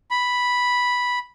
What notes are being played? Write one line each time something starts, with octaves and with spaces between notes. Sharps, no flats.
B5